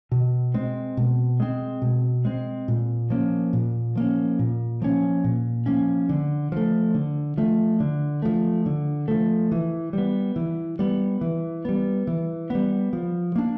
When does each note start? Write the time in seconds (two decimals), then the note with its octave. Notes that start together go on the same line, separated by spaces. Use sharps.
0.11 B2
0.54 G#3 C4
0.97 B2
1.40 G#3 C4
1.82 B2
2.25 G#3 C4
2.68 A#2
3.10 F3 A#3 C#4
3.53 A#2
3.96 F3 A#3 C#4
4.39 A#2
4.82 F3 A#3 C#4
5.24 A#2
5.66 F3 A#3 C#4
6.09 D3
6.52 F3 A3
6.94 D3
7.37 F3 A3
7.80 D3
8.22 F3 A3
8.66 D3
9.08 F3 A3
9.52 E3
9.93 G3 B3
10.36 E3
10.79 G3 B3
11.21 E3
11.65 G3 B3
12.07 E3
12.50 G3 B3
12.93 F3
13.36 A#3 D4